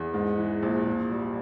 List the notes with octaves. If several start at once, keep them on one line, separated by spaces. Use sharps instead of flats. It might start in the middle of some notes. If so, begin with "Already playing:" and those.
Already playing: E2
G#2
E3
A#1
A#2
G3